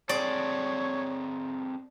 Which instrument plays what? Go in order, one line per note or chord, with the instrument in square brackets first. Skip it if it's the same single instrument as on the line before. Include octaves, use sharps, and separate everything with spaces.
[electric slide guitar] C4 G#4 A4 [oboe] C#5 [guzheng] D5